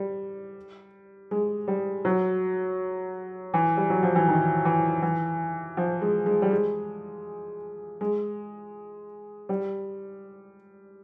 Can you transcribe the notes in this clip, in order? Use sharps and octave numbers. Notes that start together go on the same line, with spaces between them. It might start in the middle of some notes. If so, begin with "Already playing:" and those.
Already playing: G3
G#3
G3
F#3
E3
G3
F#3
F3
E3
D#3
E3
E3
F3
G#3
G#3
G3
G#3
G#3
G3